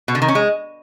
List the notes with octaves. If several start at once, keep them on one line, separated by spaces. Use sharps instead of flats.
B2
D3
D#3
C#4
G#3